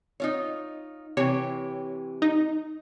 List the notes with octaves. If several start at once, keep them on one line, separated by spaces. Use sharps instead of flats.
D#4 F4 C#5
C3 E3 G4 C#5
D#4